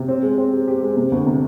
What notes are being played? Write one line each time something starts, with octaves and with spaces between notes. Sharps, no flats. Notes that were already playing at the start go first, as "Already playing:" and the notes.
Already playing: C3
C4
G#3
C4
G4
G4
G#3
C3
D2
C3